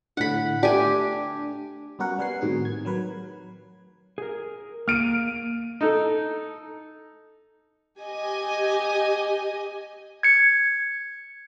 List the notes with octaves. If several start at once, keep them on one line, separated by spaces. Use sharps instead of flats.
A2 D3 F#5 B5
A3 D4 G4 G#5
G3 B3 C#4 F#4 A#4 F#5
G3 B4 F#5 G#5 C7
A2 D#3 C4 F#4 G#4
G#6
F#3 A#4 B4
G#4 A#4
A#3 F6 D7 D#7
D#4 A4
G4 D#5 G#5
G#6 C#7